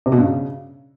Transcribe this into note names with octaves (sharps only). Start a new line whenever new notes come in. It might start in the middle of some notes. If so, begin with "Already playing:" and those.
C3
B2
G2
C#3